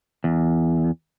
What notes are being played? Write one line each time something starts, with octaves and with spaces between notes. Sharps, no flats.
E2